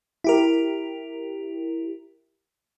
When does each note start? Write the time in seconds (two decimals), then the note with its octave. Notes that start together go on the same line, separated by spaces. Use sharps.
0.24 E4 G4 A#4